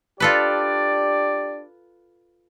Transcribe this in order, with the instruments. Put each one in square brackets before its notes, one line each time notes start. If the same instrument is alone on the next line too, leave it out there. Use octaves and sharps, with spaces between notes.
[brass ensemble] D4 G4 D5 [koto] F4 A4 B4